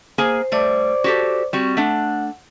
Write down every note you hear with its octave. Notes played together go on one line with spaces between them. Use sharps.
A#3 G#4 C5 G#5
G3 A3 C5 D5 D6
F#4 G4 A4
G3 C4 F#4 C#6
A3 D4 F#5